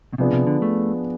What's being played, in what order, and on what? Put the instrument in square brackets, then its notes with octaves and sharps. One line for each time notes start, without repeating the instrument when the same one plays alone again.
[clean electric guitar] B2
[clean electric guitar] C3 [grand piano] F3 B3 D4 G#4
[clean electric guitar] C3
D3
A3